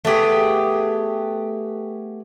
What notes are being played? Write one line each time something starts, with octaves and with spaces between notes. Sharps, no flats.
A3 B3 G4 G#4